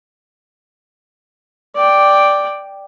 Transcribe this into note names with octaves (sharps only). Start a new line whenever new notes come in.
D5 G5